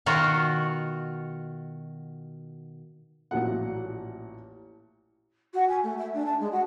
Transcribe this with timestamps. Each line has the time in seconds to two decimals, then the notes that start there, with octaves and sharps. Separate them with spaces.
0.06 B2 D#3 F4 F#4
3.31 A1 A#2 F3 F#3 A3 F#5
5.54 F#4
5.69 G#5
5.83 A3
5.98 E5
6.14 D4
6.26 A5
6.39 G#3
6.52 F#4